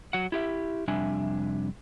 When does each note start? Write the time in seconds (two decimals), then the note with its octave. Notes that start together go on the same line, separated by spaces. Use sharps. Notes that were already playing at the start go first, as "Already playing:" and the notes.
0.13 F#3 F#5
0.32 E4 G4 E5
0.88 F2 C3 G3 D4 E5 G#5